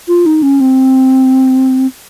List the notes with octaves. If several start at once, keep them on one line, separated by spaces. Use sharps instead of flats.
F4
D#4
C#4
C4